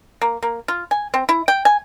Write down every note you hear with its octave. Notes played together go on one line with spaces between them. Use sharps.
A#3
A#3
F4
G#5
C4
E4
G5
G#5